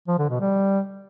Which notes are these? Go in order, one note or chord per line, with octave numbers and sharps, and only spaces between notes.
F3
D3
B2
G3